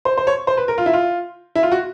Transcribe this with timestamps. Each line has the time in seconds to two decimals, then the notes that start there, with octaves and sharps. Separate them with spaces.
0.05 C5
0.18 C5
0.27 C#5
0.47 C5
0.57 B4
0.68 A#4
0.78 F4
0.86 E4
0.93 F4
1.55 E4
1.63 F4
1.72 F#4